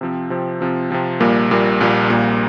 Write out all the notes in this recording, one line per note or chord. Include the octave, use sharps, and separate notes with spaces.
C3 F3 C4
C3 F3 C4
C3 F3 C4
C3 F3 C4
A#1 A#2 G3 A#3
A#1 A#2 G3 A#3
A#1 A#2 G3 A#3
A#1 A#2 G3 A#3